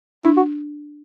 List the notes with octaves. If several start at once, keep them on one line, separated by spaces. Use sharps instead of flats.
D4 E4
F#4